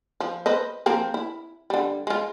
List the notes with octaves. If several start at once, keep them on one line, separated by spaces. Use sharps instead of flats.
F3
B4 C5 D#5
F3 A#3 C4
E4
D3 G3
G#3 F4